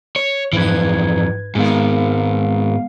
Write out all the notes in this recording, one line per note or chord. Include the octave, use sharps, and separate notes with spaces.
C#5
F2 G#2 E3 B4 G#6
G#2 D#3 G#3 B3 F5